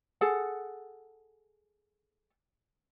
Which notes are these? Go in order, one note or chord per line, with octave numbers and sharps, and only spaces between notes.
G#4 A4 F#5